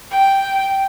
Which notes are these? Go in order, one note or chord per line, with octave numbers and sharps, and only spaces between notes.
G5